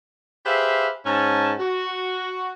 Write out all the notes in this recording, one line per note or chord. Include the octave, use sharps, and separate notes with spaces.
G4 G#4 B4 C5 E5 F5
G#2 C#4 A5
F#4